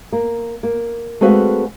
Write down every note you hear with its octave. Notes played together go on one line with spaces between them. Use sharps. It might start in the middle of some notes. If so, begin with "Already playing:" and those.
A#3
A#3
G#3 A3 C4 F#4 B4 F5